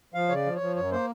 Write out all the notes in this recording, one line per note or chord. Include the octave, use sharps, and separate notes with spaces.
F3 F5
C#3 C#5
D5
F3
C#5
F3
F#2 C#5
A#3 C5